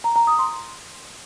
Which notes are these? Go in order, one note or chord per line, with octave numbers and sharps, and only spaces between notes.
A#5
A#5
D#6
C6